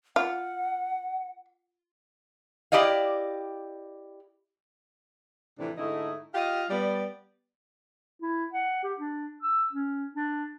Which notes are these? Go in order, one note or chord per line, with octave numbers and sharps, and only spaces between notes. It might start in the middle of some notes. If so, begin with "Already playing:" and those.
F4 F#5
E4 G4 D5 D#5 F5
A2 C3 E3 F3 D4
G#2 D3 A3 D#4 E4 D#5
F4 G4 D#5 F5
G3 B3 D5
E4
F#5
G4
D4
E6
C#4
D4